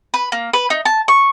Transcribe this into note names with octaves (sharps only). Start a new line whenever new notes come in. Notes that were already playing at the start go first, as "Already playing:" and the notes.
B4
A#3
B4
D#4
A5
C#6